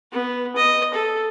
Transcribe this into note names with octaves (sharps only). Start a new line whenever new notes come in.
B3
D#5
A4